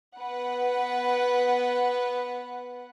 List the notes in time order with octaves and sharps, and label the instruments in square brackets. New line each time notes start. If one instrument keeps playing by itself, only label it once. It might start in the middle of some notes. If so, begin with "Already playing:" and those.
[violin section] B3 B4 F#5